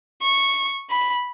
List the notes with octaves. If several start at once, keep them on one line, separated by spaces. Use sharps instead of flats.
C#6
B5